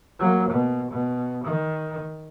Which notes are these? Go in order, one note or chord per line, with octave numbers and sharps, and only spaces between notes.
F#3 A#3
B2
B2
D#3